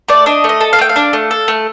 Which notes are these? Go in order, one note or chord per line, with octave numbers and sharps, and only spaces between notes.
A3 D5
D4 D#5
A3 D#5
A4
F5
A3 G5
F5
D4
A3
A4
A3